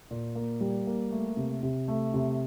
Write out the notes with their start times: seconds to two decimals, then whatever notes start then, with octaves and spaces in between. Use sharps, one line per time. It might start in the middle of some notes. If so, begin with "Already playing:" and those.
0.11 A#2
0.35 A#3
0.61 G3
0.87 A#3
1.11 A3
1.37 C3
1.63 C3
1.88 A3
2.14 C3